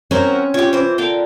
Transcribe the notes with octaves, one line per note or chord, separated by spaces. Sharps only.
C4 C#4 F#4 A#4 C5 G#5
F4 G4 C#5
E3 C5
D3 A#4 F5 G5